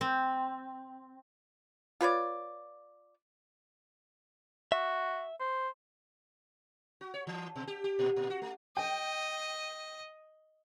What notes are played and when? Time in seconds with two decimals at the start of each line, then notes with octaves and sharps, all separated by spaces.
0.01 C4
2.01 F4 B4 C#5 D5
4.72 F#4 E5
5.40 C5
7.01 F#4
7.14 C#5
7.27 E3
7.56 B2
7.67 G4
7.84 G4
7.99 A#2
8.16 A#2
8.30 F#4
8.42 A3
8.77 D#5 G5